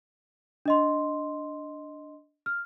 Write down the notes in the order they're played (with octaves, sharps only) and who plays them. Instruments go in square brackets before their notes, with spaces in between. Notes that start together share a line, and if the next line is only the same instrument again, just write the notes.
[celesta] D4 D#5 C6
F6